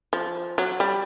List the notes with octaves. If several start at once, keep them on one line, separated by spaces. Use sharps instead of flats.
F3
F#3
G3